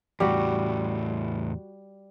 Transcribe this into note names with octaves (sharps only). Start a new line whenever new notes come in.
E2 A2 G3 F#4